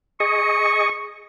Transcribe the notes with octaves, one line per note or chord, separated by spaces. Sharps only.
G#4 D#5 C#6